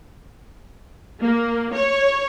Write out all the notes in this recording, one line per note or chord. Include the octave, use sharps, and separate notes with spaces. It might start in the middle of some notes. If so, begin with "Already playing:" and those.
A#3
C#5